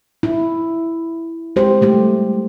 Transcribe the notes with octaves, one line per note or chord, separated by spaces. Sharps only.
E4
G#3 G4 C5
G3 A3 G4